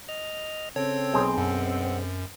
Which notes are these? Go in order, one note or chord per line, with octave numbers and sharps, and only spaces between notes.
D#5 F6
C#3 C4 A4 C#5
B1 G#4 C5
F#2 F#5